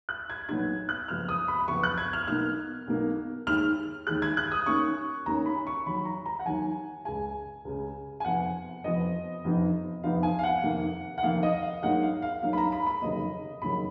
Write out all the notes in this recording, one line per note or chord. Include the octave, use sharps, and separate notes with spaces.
F#6
G#6
B1 A#2 F#3 B3 D#4 G#6
F#6
F#1 F2 F3 B3 F6
D#6
B5
B5
F#1 F2 F3 B3 C#6
F#6
G#6
F6
B1 B2 A#3 D#4 F6
B1 B2 A#3 D#4
D#2 D#3 G#3 F6
D#2 D#3 G#3 F#6
G#6
F#6
D#6
D#2 D#3 A#3 C#4 C#6
D#2 D#3 A#3 C#4 A#5
B5
C#6
D#2 D#3 F#3 B5
A#5
A#5
F#5
D#2 D#3 F#3 G#5
C#2 C#3 G#3 G#5
C#2 C#3 G#3
G#5
F1 F2 F3 B3 F#5
F1 F2 F3 B3 D#5
F1 F2 F3 B3 D#4
F1 F2 F3 B3 D#4 F5
G#5
F5
F#5
F1 F2 D#3 A#3
F#5
F1 F2 D#3 A#3 F5
D#5
F5
G#2 F#3 A#3 D#4 F#5
F5
F5
G#2 F#3 A#3 D#4 F5
B5
A#5
B5
B5
F1 D#2 C#3 F#3 A#3 D#5
F1 D#2 C#3 F#3 A#3 B5